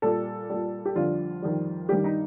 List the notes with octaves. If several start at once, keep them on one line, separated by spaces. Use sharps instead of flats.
A#2 G3 A4
A#2 G3
G4
F2 D3 G3 F4
F2 D#3 G3
G2 D#3 G3 G4
D#4